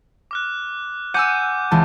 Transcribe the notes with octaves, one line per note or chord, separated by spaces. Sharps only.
D6 F6 F#6
F#5 G#5 D6 E6 G6 D#7
C#2 E3 A5